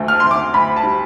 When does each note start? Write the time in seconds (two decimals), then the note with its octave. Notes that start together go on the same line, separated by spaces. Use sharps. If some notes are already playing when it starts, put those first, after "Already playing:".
Already playing: D2 D3 A3
0.08 F6
0.20 D2 C6
0.31 D6
0.54 D2 B5
0.76 A5
0.83 G3